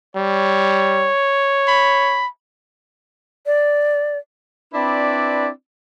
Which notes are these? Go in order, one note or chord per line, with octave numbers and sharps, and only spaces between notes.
G3 C#5
B5
D5
C4 D4 E4 B4 D5